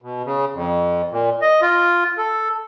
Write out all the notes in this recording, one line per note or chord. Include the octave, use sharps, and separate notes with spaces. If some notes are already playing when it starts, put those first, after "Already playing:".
B2
C#3
F2
A#2
D#5
F4
A4